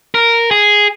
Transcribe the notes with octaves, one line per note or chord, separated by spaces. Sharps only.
A#4
G#4